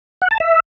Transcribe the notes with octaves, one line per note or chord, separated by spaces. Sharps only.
F#5
A5
E5